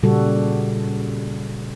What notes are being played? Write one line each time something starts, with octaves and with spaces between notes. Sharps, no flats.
A#2 C#3 G3 F#4 A4